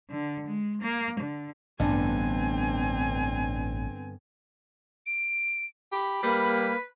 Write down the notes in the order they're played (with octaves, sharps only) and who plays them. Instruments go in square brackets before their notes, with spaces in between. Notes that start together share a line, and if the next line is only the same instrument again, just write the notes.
[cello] D3
G#3
A#3
D3
[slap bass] A1 [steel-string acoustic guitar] G2 D3 B3 [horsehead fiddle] C4 G#5 [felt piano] D4
[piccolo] D7
[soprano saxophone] G4 [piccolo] B5
[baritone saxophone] G3 [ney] A#3 [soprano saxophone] B4